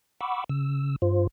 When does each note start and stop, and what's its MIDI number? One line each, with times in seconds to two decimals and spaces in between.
0.21 0.44 78
0.21 0.44 83
0.21 0.44 85
0.21 0.44 86
0.21 0.44 88
0.49 0.96 49
0.49 0.96 88
1.02 1.27 43
1.02 1.27 65
1.02 1.27 72